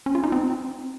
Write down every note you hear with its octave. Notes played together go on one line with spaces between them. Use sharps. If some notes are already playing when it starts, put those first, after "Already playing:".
C#4
F4
D#4
C4